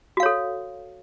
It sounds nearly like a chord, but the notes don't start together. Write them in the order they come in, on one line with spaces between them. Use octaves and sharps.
F#4 F5 C#5 A4